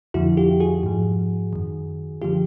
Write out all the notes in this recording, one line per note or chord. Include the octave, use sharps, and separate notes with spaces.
F2 D3 F3 E4 F#4
F4 G4
F#4 G#4
G#2 F3
F#2 D#3
D3 F3 F4 G4